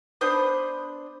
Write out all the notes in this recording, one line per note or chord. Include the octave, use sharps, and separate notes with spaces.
B3 D4 C5 D#6